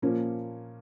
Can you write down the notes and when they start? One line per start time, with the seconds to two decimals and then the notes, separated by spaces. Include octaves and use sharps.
0.02 A#2 F3 A#3 C#4